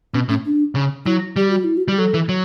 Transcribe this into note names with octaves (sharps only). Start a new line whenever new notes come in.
B2 C#4
A2 C#4
D4
C#3
F#3 E4
G3 G4
F#4
E4
F#4
G3 G4
F#3 A4
E3
F#3